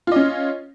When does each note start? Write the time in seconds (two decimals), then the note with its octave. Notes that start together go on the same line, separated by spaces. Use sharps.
0.07 F4
0.12 D#5
0.16 C#4